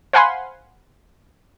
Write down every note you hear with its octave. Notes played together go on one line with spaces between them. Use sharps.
C5 F5 F#5 G#5 B5 C6